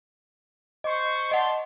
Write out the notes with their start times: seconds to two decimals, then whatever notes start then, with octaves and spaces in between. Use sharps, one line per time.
0.84 C5 D#5 C#6
1.31 D5 D#5 F#5 A5 C6